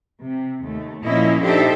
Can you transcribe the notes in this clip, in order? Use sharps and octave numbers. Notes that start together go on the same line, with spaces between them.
C3
D#2 A3
A#2 F3 A#3 C#4 E4 D#5
D4 D#4 G4 A4 C5 E5